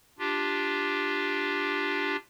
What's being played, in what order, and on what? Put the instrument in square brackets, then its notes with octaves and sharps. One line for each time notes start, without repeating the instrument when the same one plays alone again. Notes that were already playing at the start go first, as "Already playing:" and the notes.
[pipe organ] D4 F4 G4